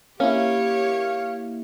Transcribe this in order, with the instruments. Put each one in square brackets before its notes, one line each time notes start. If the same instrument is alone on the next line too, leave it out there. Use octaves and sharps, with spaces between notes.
[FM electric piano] A#3 E4 [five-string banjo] C#4 [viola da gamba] G4 C#5 [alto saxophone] F5